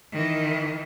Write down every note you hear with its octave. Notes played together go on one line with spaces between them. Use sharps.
D#3 E3